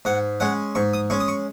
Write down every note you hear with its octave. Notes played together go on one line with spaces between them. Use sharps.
G#2 F#5
G#3 C#4 F#5
G#2 C#6
D#6
G#3 C#4 C#6
D#6
C#6